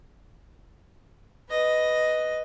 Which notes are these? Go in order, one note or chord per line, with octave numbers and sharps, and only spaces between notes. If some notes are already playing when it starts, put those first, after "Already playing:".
B4 D#5